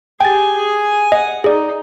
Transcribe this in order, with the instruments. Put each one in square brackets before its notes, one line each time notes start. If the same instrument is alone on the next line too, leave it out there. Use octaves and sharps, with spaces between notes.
[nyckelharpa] G4 G#4 [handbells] G5 A6 [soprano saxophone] G#5
[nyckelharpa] G#4
[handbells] D#5 [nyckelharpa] F#5
[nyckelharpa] D#4 [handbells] G#4 D5